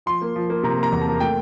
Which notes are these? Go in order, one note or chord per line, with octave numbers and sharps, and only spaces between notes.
F3 C6
A#3
F3
A#3
C3 A#5
A#3
A#5
E2
A5
A#3
A3 G5